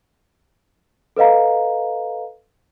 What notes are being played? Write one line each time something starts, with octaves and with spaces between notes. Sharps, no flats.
A4 B4 D#5 F5 A#5